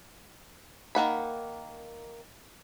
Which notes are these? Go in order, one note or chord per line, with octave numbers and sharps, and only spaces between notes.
D#3 A#3 F#5 B5